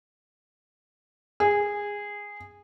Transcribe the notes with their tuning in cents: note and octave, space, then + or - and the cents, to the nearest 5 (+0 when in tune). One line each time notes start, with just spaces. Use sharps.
G#4 -15